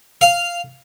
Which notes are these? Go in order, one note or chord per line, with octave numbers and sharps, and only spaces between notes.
F5